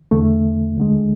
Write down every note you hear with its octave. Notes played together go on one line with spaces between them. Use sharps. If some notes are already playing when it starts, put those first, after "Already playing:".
E2 D3 A3
D2 D3 G#3